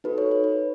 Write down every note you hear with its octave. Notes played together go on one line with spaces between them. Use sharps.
D#4 F#4 A4 B4
C#5
C#5
B4